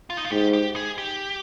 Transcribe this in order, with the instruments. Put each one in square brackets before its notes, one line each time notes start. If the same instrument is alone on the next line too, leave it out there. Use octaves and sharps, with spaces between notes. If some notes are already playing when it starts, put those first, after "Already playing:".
[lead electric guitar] F4
D#4
F4
[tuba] G#2 [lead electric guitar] G4
[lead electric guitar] G4
G#4
G4